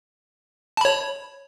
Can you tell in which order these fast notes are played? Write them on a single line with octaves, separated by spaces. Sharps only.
A5 B5 C#5